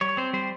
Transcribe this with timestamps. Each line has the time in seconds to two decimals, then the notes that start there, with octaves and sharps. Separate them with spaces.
0.01 G3 C#5
0.17 C4 C5
0.33 G3 C5